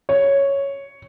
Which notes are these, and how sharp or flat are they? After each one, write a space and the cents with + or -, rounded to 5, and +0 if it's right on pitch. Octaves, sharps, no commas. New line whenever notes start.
C#5 +0